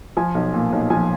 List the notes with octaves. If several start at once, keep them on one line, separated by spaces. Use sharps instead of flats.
F3 G#5
B1
A#2
B1
F3 G#5